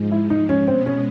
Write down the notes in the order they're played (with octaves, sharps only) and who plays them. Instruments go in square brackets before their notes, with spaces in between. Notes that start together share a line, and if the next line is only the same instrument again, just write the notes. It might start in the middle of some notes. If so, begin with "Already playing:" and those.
Already playing: [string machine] G#2 F3 G#3
[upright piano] E4
D#4
C#4
[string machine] B2 G#3 B3 [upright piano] C4
[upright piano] C#4